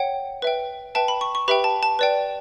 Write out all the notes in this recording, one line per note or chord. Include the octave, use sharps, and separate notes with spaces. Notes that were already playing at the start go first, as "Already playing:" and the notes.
Already playing: C#5 F#5 G5
B4 E5 G5
B4 E5 G5 A5
B5
C#6
C#6
G4 B4 E5 G5 B5
A5
A5
B4 D5 G5